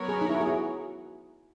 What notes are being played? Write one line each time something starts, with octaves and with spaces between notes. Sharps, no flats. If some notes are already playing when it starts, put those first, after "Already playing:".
Already playing: F#3 B3 F#4 A#4 C#5
G#4
D#4
E4
G#4
F#4